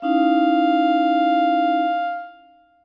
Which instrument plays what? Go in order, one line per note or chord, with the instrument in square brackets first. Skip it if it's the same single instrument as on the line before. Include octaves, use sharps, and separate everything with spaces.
[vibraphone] C#4 D#4 E4 [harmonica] F5